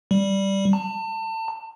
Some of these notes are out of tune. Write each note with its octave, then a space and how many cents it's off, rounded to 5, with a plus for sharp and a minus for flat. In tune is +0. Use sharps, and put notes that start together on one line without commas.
G3 -5
A5 +30